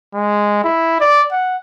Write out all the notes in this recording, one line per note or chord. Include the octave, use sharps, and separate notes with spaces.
G#3
E4
D5
F#5